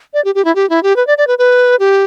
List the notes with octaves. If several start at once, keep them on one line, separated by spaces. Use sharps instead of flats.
D5
G4
G4
E4
G4
E4
G4
B4
D5
D5
B4
B4
G4